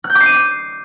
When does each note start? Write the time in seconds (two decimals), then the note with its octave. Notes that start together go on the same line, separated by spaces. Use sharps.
0.04 F#6
0.10 G6
0.15 D6
0.21 C7
0.26 D#7